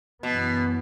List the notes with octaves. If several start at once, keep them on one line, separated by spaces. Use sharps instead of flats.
F#2 B2 E3 B3